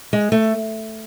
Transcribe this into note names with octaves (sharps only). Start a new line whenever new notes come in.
G#3
A3